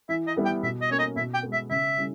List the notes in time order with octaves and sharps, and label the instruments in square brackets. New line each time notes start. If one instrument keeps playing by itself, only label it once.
[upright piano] E3 [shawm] E5
[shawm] D#5
[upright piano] G3 B3 E4
[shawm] G5
[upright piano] B2 [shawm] E5
[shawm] D#5
[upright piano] A#3 C#4 [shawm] C#5
[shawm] D#5
[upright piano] B2 [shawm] E5
[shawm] G5
[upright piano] G#3 B3
[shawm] E5
[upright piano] C#3 [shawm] E5
[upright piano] G3 C#4 E4